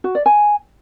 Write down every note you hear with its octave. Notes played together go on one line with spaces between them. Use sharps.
F#4
D5
G#5